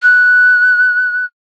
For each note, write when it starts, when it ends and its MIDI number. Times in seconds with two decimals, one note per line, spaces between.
0.02 1.25 90